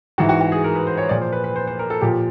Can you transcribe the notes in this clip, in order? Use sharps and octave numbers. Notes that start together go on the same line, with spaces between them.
G#2 E3 F#4
F#4
F#4
G#4
A#4
B4
C5
C#5
A#2 F3 D5
C5
B4
B4
C5
C5
A#4
A4
A#2 F3 G4